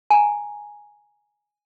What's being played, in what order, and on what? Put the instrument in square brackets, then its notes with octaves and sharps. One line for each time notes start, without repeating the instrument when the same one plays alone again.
[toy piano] G#5 A#5